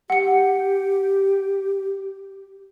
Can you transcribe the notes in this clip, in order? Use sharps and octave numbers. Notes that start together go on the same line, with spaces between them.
G4 F#5 C#7